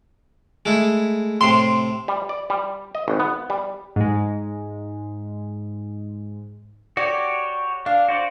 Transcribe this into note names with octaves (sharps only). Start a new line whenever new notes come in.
G#3 A3 E4
A2 C3 C6
G3
D5
G3
D#5
G#1
B3
G3
G#2 G#3
F#4 G4 C#5 D5
D4 F5
F#4 C5 D5